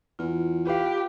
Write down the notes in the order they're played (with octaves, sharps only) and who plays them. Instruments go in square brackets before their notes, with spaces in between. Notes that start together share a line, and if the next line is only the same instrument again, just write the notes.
[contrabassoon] E2 [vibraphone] F4
[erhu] G4 [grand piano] B4 F5